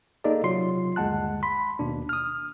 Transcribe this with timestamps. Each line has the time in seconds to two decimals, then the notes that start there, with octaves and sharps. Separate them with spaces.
0.24 A#3 D#4 G#4 A4 D5 D#5
0.43 C3 F#3 F4 C6 C7
0.96 G1 D#2 G#3 F#5 A5 F#6
1.43 B5 C6 B6
1.79 D#2 B2 D4
2.09 D#6 F6